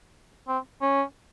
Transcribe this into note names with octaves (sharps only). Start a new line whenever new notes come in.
C4
C#4